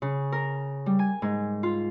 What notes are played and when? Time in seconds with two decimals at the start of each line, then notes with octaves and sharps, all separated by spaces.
0.02 C#3
0.32 A#4
0.86 G3
0.99 G#5
1.22 G#2
1.63 F4